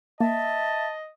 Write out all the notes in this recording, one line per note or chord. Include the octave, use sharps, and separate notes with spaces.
A#3 D#5 E5 A5